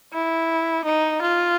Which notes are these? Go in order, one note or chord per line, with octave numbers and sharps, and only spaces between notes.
E4
D#4
F4